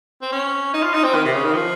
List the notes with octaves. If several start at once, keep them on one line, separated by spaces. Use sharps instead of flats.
C4
C#4
D#4
F4
D#4
C4
D#3
C3
C#3
D#3
F3